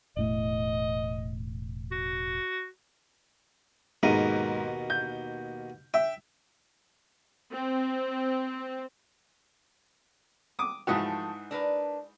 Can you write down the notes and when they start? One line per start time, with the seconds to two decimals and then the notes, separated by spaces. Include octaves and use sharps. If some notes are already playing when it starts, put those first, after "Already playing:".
0.17 E1 A2 A3 D#5
1.92 F#4
4.03 D#2 G#2 B2 A#4 D#7
4.90 G6
5.94 E5 G5
7.51 C4
10.59 D6 D#6
10.87 G#2 E3 F3 A3 F#4
11.51 D4 A#4 B4